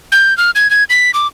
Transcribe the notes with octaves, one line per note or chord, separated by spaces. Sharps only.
G6
F6
G#6
G#6
B6
D6